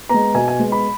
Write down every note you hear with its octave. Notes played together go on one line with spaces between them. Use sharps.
G#3 B3 A#5
B2 G#5
G#5
G#3 B3
B5